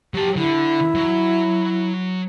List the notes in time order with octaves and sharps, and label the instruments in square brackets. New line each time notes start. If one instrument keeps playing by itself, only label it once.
[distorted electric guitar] F#3 A5 [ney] G4
[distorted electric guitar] D3 [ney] E4
[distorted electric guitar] F#3